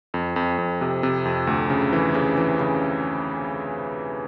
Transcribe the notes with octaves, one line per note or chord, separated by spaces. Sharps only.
F2
F2
F2
C3
C3
F2
D2
C#3
E3
C#3
E3
C#3